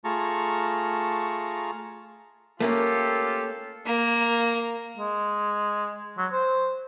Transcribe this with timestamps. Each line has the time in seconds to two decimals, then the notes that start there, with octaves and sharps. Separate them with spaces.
0.04 A3 F4 G#4 A5 A#5 C#6
2.60 A3 A#3 C#4 F4 G4 A4
3.87 A#3
4.98 G#3
6.18 F#3
6.32 C5